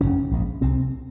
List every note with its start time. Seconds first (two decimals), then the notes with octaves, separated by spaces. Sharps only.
0.01 F1 D#2 C#3 C#4
0.31 A#1 G#2
0.61 C2 C3 C4